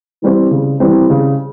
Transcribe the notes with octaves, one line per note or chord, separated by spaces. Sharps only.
E3 G3 C4
C#3
E3 G3 C4
C#3